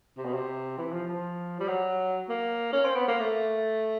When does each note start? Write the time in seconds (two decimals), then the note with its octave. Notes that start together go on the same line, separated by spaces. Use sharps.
0.17 C3
0.25 B2
0.34 C3
0.78 E3
0.93 F3
1.08 F3
1.60 G3
1.68 F#3
2.29 A#3
2.73 C#4
2.85 C4
2.96 B3
3.08 A#3
3.20 A3